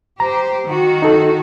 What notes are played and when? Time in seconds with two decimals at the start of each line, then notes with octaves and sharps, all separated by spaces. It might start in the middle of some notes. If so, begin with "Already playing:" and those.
0.20 G4 C5 A#5
0.66 D#3 F#4
1.02 D#4 A4